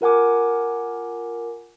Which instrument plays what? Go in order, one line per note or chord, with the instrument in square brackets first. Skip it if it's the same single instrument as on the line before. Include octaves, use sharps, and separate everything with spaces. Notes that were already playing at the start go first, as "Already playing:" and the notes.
[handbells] F4 A#4 F#5 G#5 D6